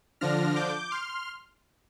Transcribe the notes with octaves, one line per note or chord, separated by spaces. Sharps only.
D3 F3 D4 F6 A#6
D6 G6
C6 F6